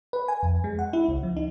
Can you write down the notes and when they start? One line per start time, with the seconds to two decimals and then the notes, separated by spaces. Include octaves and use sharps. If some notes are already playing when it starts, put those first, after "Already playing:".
0.13 B4
0.28 G#5
0.43 F2
0.64 G#3
0.79 F#5
0.93 E4
1.08 C#2
1.23 F3
1.37 D#4